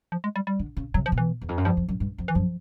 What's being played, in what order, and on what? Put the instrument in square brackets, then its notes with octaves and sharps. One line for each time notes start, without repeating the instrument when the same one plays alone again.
[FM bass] F3
G#3
G3
G3
[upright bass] D3
C#3
[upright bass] C3 [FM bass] F#3
[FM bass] F3
[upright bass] B2
[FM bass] E3
[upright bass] E2
F2
F#2
[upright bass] G2 [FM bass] F3
[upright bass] F2
F#2
G2
F2
[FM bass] E3
[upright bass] F#2 [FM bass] F3